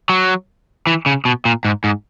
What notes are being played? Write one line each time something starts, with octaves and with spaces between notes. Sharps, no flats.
F#3
E3
C#3
B2
A#2
G#2
G#2